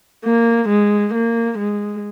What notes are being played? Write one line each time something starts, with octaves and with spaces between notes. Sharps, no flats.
A#3
G#3
A#3
G#3